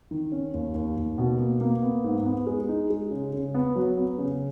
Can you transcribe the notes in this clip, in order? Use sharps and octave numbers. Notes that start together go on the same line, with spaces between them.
D#3
C#4
D#2
D#2
D#2
B2
A#3
A#3
B3
G#2
B3
G#3
D#4
G#3
C#3
C#3
B3
F#3
B3
C#3